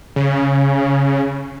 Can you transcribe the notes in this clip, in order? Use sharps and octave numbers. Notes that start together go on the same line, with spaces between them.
C#3